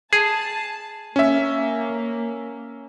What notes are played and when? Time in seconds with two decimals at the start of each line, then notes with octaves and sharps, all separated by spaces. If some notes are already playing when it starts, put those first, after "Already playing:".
0.13 G#4 A5
1.16 A#3 C#4 E5